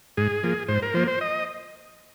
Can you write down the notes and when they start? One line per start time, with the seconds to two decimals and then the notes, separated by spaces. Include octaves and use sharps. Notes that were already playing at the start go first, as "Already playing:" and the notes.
0.17 G#2 G#4
0.43 F3 A#3
0.68 G#2 C5
0.82 A#4
0.94 F3 A#3 C5
1.08 C5
1.21 D#5